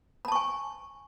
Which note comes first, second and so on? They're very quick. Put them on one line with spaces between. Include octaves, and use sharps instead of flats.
B5 A5 C#6 G#5